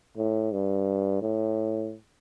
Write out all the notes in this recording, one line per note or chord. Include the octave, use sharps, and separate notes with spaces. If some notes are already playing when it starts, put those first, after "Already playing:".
A2
G2
A2